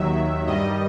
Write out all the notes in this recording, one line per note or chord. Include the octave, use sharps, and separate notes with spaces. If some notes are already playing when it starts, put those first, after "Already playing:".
Already playing: D#2 D#3 F#3 E5
G2 D#3 G3 D#5